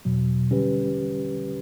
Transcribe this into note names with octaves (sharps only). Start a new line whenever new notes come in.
E2 B2 F#3
D3 G3 C#4 G4 B4